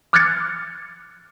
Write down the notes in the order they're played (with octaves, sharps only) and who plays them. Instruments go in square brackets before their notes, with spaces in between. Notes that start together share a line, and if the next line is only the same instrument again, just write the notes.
[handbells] D6 F6 F#6 G#6 A6 C#7